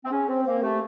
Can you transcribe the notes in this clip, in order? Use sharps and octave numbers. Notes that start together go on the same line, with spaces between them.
C4
C#4 G#4
C4 C5
A#3 C5
A3 G4